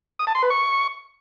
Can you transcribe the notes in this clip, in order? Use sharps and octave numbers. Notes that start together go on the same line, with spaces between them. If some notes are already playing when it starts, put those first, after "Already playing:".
D#6
A5
C6
B4
C#6